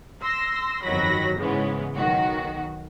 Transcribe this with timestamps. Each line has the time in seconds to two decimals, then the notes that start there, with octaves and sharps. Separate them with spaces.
0.22 C6 E6 A#6
0.83 G1 F2 D#3 F#3 B5 A#6
1.38 G#2 C#3 E3 G#3 B3 C#4
1.96 B1 D#3 F#4